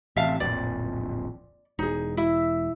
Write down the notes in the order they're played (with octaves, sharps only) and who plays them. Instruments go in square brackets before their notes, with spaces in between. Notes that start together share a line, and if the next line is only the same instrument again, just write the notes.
[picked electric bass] A1 C3 [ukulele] E5 F5 A5
[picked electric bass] D1 A#1 F2 [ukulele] D5
[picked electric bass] E1 [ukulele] D#4 G#4
[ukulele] E4 E5